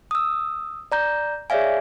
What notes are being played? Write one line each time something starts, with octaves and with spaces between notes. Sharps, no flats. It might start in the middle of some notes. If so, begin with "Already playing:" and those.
D#6 E6
D5 A#5 G6
G#4 C#5 D5 E5 F5 G#5